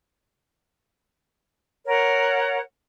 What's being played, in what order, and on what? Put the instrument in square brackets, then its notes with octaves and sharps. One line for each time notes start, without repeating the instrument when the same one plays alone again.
[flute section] A#4 C#5 F#5